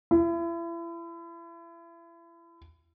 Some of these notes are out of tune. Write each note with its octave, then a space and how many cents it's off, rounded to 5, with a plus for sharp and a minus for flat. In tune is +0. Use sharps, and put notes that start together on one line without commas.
E4 +35